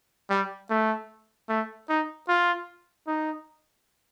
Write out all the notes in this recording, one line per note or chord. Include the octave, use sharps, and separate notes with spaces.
G3
A3
A3
D#4
F4
D#4